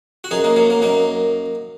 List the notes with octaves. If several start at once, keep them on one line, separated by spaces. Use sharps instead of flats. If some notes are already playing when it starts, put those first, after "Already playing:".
F#4
F#2 D#4 G#4
A#3 D#4
F#3 A#3
A#3
F#2 A#3 D#4